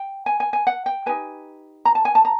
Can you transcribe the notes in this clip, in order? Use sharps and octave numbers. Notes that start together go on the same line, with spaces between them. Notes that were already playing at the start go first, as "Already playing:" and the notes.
Already playing: G5
G#5
G#5
G#5
F#5
G5
D#4 G4 B4 G#5
A#5
A5
G#5
A5
A#5